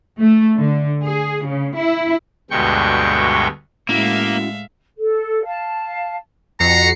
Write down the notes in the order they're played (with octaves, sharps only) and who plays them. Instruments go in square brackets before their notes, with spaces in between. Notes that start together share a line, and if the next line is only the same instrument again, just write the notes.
[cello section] A3
D3
G#4
C#3
E4
[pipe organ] D2 G2 B2 G#3 G5 C#6
[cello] A2 G#3 [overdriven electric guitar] A#3 [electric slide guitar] C#4 E4 F#4 [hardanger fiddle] E5 F5
[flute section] A4
F5 A5
[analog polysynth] F2 C7 C#7 [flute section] F#4 D#5 [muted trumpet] A#5